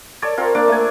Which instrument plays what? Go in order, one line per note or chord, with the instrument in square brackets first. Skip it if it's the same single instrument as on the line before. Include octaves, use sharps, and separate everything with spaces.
[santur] A4 C#5 D5
C4 F4 A#4
A#3 D4 F5 D6
A3 G#5